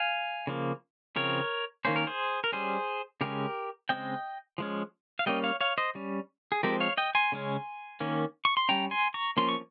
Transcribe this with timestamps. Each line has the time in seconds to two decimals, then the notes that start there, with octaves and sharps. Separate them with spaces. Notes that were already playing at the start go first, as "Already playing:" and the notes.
Already playing: F5 G#5
0.47 C#3 F3 A#3
1.16 C#3 F3 C4 A#4 C#5
1.85 D#3 A#3 C#4 C5
1.96 A#4
2.07 G#4 C5
2.44 A#4
2.52 G3 C#4 G#4 C5
3.21 C#3 G#3 C#4 G4 A#4
3.89 C#3 G#3 C4 D#5 G5
4.58 F3 G#3 C#4
5.19 F5
5.26 G3 A#3 C#4 D#5 G5
5.44 C#5 F5
5.61 C#5 F5
5.78 C5 D#5
5.95 G3 C#4
6.52 G#4
6.63 F3 G#3 C4 G4 A#4
6.80 C#5 F5
6.97 D#5 G5
7.15 G#5 C6
7.32 C#3 G#3 C#4
8.00 D#3 A#3 C#4
8.45 C#6
8.57 C6
8.69 G3 C#4 G5 A#5
8.91 G#5 C6
9.14 A#5 C#6
9.37 F3 A#3 C#4 C6
9.49 C#6